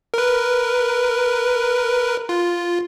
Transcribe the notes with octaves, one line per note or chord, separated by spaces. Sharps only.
A#4 B4
F4